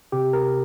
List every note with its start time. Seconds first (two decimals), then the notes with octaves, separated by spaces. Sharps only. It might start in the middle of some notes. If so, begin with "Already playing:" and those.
0.12 C3 G4
0.33 A#4